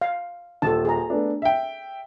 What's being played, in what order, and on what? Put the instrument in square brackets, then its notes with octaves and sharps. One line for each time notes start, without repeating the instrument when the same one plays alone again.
[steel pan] F5
[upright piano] D#1 [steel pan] A4 A5
[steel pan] G#4 A#5
[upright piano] A3 B3 D4
E5 G5